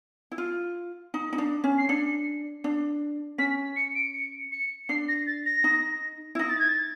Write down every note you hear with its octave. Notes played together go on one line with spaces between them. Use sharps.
E4
F4
D#4
D#4
D4
C#4
C7
D4 C#7
D4
C#4 B6
C#7
D7
C#7
C#7
D4 C7
A#6
A6
A#6
D#4
E4
D#4 A#6
A6
G#6
A6